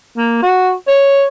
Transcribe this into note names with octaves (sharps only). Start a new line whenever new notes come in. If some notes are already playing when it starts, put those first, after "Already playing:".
A#3
F#4
C#5